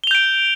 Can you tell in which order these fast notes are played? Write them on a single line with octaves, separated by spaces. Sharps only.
G7 F7 G6 D7